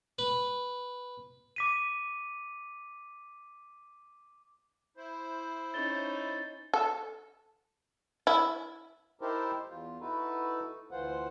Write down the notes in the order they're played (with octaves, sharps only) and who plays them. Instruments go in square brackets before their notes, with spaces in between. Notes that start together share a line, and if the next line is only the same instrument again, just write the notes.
[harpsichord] B4
[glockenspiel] D6 B6 D#7
[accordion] E4 C5
[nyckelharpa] C#4 D#4 [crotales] A6 G7
[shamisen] A4
E4
[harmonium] D#4 E4 G4 A4 A#4 C5
E2 F4
D#4 E4 F#4 A4 B4
D2 E3 F4 C5 F#5